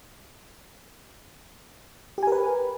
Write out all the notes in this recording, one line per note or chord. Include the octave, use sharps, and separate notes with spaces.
G4 A#4 B4 G#5